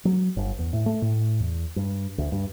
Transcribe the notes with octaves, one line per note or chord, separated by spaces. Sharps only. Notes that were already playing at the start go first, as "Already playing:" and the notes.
F#3
G1
E2
A2
A3
A2
E2
G2
D2
G2